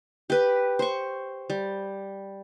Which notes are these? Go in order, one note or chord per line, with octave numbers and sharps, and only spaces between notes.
G4 B4
C5 C#6
G3